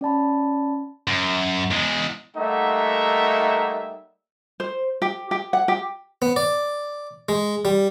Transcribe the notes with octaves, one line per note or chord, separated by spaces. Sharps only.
C#4 D5 A5 B5
F#2
E2 G#3
G3 A3 A#3 D#4 E5 F#5
C5
G4
G4
F#5
G4
B3
D5
G#3
G3